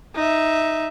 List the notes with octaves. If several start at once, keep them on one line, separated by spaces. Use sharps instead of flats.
D#4 E5